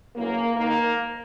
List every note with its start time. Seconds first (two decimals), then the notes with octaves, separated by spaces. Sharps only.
0.16 F#2 C#3 E3 A#3
0.57 G#2 D#3 A#3